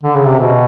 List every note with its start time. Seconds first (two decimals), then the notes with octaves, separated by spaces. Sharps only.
0.03 D3
0.15 C#3
0.27 C3
0.39 B2